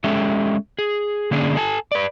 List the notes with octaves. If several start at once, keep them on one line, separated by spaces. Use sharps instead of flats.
G#3 C#4 G4 A4 E5
G#4
D3 A#3 C#4 D4 G#4
A4 G#5 A5
B4 D5